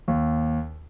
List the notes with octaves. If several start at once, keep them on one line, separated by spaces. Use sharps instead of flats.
D#2